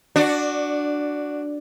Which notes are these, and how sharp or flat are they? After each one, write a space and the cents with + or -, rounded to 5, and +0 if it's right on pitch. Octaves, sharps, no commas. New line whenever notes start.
D4 +0 F#4 +0 D5 +20